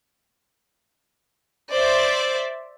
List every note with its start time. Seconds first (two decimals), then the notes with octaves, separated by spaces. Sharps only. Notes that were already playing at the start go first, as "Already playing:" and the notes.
1.73 C5 D5 E5